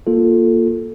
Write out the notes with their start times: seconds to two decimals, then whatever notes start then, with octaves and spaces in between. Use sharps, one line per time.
0.07 A#3 F4 A4